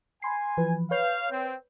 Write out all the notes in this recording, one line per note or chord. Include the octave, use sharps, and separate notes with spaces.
G#5 B5 C6 C7
E3 F3 B4
B4 C#5 F5 G6
C4